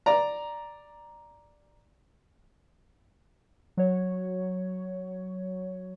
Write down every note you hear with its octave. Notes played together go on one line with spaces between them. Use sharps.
D5 A#5
F#3 C#5